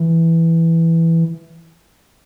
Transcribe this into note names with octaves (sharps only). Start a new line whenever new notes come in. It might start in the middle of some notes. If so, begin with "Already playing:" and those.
Already playing: E3